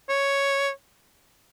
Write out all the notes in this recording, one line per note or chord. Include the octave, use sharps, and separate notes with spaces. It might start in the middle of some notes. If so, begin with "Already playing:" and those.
C#5